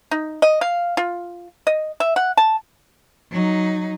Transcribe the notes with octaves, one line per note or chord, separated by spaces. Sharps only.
D#4
D#5
F5
F4
D#5
E5
F#5
A5
F#3 D#4